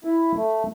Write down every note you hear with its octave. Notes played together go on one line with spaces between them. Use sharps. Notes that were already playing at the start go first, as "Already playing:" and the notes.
E4
A3